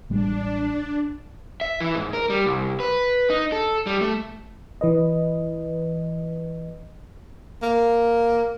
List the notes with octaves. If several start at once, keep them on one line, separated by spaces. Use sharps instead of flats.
A1 G3 G#3 D4
E5
E3
G#2
A#4
G3
C2
B4
D#4
A4
G3
A3
E3 B4 D#5
A#3